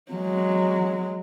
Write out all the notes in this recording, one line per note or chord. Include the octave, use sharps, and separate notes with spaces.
F#3 G#3